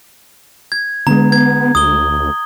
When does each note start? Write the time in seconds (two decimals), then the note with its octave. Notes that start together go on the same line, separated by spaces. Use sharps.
0.72 G#6
1.07 D3 G#3 B3 A#5
1.32 G#6
1.75 D2 D#6 G7